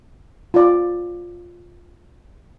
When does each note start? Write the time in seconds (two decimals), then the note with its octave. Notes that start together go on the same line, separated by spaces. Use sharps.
0.54 F4 D5